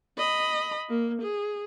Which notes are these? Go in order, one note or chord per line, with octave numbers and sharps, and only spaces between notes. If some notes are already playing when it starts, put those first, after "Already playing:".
D#5 B5
A#3
G#4